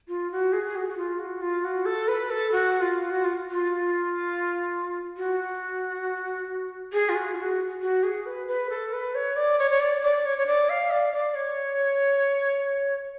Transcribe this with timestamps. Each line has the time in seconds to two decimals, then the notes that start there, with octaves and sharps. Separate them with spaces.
0.08 F4
0.32 F#4
0.53 G#4
0.66 G#4
0.76 F#4
0.89 F#4
0.98 F4
1.19 F#4
1.41 F4
1.64 F#4
1.86 A4
2.08 B4
2.30 A4
2.52 F#4
2.81 F4
3.10 F#4
3.24 F4
3.50 F4
5.17 F#4
6.93 G#4
7.09 F4
7.15 F#4
7.33 F4
7.38 F#4
7.82 F#4
8.03 G#4
8.26 B4
8.48 B4
8.70 A4
8.93 B4
9.15 C#5
9.36 D5
9.59 C#5
9.71 C#5
9.80 D5
10.02 D5
10.25 C#5
10.38 C#5
10.47 D5
10.69 F5
10.91 D5
11.13 D5
11.35 C#5